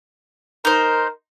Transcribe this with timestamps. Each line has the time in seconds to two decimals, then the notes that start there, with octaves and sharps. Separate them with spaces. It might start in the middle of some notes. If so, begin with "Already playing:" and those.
0.65 D#4 A#4 C5